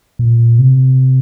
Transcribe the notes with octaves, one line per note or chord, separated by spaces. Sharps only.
A#2
C3